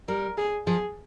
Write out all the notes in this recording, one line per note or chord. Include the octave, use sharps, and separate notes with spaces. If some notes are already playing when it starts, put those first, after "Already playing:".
G3 A#4
G#4
F3 G#4